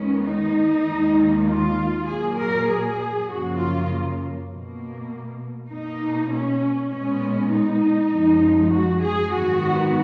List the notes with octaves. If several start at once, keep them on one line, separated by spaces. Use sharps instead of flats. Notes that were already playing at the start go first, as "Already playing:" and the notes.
Already playing: D#2 D#3 G#3 B3 C#4
D#4
D#2 D#3 G#3
F4
A#2 F#3 A#3 G#4
A#4
G#4
F#2 C#3 F3 A#3 F#4
F4
B2 A#3
B2 A#3 D#4
C#4
A#2 G#3 B3 C#4
D#4
F#2 F3 G#3
F#4
G#4
G#2 D#3 F#3 B3 F#4